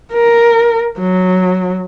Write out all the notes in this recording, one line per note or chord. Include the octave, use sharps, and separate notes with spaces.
A#4
F#3